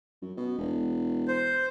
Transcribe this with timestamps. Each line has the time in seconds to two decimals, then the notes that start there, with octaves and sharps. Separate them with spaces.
0.22 F#2
0.37 B2
0.58 E1
1.28 C5